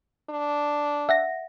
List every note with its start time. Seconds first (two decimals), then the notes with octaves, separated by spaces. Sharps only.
0.30 D4
1.09 E5 F#5 A#6